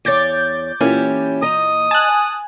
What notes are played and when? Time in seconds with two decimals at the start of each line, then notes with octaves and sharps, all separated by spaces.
0.05 E2 C#5 D6 G6 A6
0.81 A#2 E3 C#4 E4 G4
1.42 D#5 A#5 D#6
1.91 G#5 A5 F#6